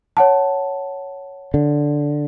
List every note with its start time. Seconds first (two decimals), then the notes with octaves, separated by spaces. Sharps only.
0.17 C#5 F#5 A5
1.54 D3